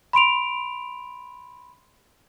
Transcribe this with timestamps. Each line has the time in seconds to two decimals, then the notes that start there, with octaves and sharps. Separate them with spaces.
0.13 B5 C6 D7 F7